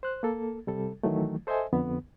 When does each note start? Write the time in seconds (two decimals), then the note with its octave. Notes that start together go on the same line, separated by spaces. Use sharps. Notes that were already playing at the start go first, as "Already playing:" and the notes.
0.03 C5 F#6
0.23 A#3 A4
0.67 C3 G3 A4
1.03 D#3 E3 F#3 A3
1.47 A4 C5 D#5 E5 G#5
1.73 F2 D3 B3